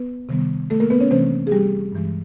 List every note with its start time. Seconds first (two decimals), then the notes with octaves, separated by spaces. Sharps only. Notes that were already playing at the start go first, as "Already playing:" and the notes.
Already playing: B3 B4
0.29 C3 D#3 G3 B3
0.70 A3 A4
0.80 A#3 A#4
0.90 B3 B4
1.00 C#4 C#5
1.11 C3 E3 A3 C4 C#4 C5
1.47 G#4
1.51 G3 G4
1.92 G2 E3 G#3